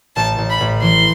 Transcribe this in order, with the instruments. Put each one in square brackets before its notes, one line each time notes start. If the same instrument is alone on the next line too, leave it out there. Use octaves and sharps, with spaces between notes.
[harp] A1 [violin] A5
[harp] A1
[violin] B5
[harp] A1
[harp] E3 [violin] C6